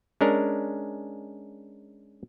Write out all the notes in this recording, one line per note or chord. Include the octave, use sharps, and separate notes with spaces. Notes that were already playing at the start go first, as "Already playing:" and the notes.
G#3 C#4 D4 A#4